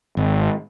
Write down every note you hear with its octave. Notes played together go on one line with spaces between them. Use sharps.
G#1